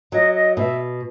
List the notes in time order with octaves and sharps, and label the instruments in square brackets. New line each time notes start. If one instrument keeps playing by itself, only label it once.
[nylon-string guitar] F#3 [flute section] D#5
[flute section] D#5
[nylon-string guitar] B2 [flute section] E5